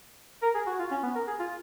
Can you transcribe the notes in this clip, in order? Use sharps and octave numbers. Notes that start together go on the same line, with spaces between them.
A#4
G#4
F#4
F4
C#4
B3
A#4
G#4
F4